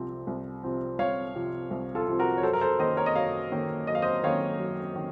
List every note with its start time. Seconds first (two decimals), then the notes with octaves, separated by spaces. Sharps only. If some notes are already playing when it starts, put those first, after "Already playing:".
Already playing: C2 C3 F3 C4
0.27 C2
0.63 C3 F3 C4
0.99 C2 C#5 F5
1.35 C3 F3 C4
1.71 C2
1.95 F4 A4
2.07 C3 F3 C4
2.19 F#4 A#4
2.37 C#5
2.43 F#2 A4 C5
2.53 A#4
2.61 A4 C5
2.79 D#3 A#3 C#4 C5 D#5
2.97 A#4 C#5
3.06 D#5
3.15 F#2 C#5 F5
3.52 D#3 A#3 C#4
3.87 F#2 D#5
3.95 F5
4.02 C5 D#5
4.24 D#3 A#3 C#4 C#5 F5
4.60 F#2
4.96 D#3